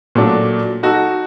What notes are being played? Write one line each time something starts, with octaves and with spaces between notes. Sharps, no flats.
A#2 F#3 A3 D4
D#4 F#4 A4